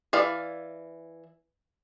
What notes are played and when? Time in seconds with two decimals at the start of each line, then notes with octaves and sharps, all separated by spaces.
0.13 E3 E4 D5 F5